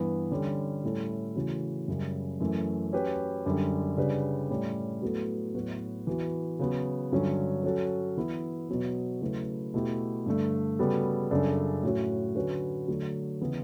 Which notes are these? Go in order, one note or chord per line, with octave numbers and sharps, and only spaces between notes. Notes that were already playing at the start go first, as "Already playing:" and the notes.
Already playing: G2 E3 B3
D3 G3 C#4
A2 G3 C#4 E4 A4
C#3 E3 A3 C#4 F#4
F#2 C#3 G3
F#2 E3 A3
F#3 C#4 G4 B4
F#2 D3 G3 D4
C#3 G3 D4 G4 B4
A2 G3 C#4
A2 F#3 B3 F#4 A4
A2 F#3 B3 F#4 B4
E3 B3 F#4
C#3 F#3 B3 F#4
G2 D3 F#3 C#4
F#3 C#4 F#4 A4
E3 B3 E4
B2 F#3 B3
C#3 F#3 A3 E4 B4
B2 A3 E4 G4
G2 D3 A3
C#3 G3 B3 F#4 A4
F#2 C#3 G3 D4 A4
A2 F#3 C#4 F#4
D3 F#3 C#4 F#4 B4
D3 F#3 A3
C#3 E3 B3 E4